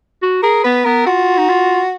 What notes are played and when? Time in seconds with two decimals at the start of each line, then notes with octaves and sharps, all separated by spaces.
0.23 F#4
0.43 G#4 A#4
0.64 B3 B4
0.85 B3 A#4
1.06 F4 F#4
1.38 D#4
1.49 F4